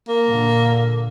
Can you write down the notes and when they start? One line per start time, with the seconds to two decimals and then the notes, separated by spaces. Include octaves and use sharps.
0.08 A#3
0.27 A#2 D3